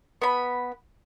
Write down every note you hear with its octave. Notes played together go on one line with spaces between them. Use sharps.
B3 B5